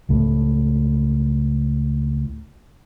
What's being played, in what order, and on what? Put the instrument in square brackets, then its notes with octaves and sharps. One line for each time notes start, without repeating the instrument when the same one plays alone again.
[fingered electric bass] C#2 A2